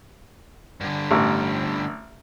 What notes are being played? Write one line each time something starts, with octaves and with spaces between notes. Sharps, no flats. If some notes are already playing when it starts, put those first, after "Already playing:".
G2 D3
A1